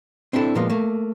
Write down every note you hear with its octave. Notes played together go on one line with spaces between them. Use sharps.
C4 D4 E4 F#4 A4
A#2 F3 G#3 A#3 B3
A3 A#3